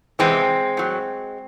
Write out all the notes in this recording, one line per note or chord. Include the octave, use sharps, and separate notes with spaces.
E2 C3 E3 G#3 C4
A2 F#3